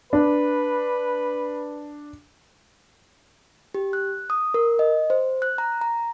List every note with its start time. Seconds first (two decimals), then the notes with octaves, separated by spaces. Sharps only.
0.13 D4 B4
3.75 G4
3.93 F#6
4.30 D#6
4.54 A#4
4.79 D#5
5.10 C5
5.42 F#6
5.58 A#5
5.81 A#5